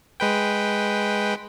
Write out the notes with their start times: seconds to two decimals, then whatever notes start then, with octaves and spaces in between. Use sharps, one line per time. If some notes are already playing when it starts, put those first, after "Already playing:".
0.20 G#3 B4 G5